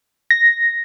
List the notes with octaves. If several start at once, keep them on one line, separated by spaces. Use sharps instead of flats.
A#6